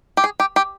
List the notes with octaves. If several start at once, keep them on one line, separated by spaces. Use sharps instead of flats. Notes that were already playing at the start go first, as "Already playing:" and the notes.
G4
G#4
G4
G4